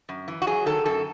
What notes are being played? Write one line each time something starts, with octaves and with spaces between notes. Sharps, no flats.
F#2
E3
F#4
F#3 G#4
D#3 A4
F#2 A4